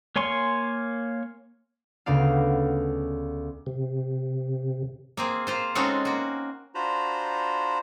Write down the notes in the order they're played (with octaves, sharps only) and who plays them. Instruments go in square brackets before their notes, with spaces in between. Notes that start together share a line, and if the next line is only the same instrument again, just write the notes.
[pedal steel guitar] A#3 C#5 G#5 C6 C#6
[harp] D2 C#3 B3 D5 F5
[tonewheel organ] C3
[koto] A#3 C4 G#4
A#3 F4 C5
G#3 C4 C#4 D#4 F#4 A4
A#3 F#4
[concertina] D4 F4 F#4 C5 A#5 B5